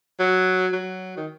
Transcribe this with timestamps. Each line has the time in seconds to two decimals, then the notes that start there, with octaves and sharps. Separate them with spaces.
0.20 F#3
0.73 F#3
1.17 D#3